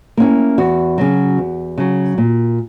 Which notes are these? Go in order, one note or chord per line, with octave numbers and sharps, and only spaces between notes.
A#3 C#4 E4
E2 F#4
C#3 F#3
E2
C#3 F#3
A#2